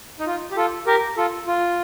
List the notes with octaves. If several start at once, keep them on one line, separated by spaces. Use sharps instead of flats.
D#4
F4
G4
F4 A4
G4 A#4
F4 A4
F4